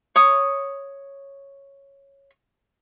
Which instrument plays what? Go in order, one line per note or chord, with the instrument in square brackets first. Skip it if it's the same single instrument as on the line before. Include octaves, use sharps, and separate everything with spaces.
[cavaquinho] C#5 D#6